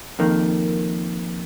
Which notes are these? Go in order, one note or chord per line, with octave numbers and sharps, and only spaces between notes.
F2 D#3 A#3